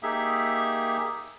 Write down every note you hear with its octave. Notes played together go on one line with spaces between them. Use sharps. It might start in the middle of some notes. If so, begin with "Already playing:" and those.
A#3 D#4 G4 G#4 E5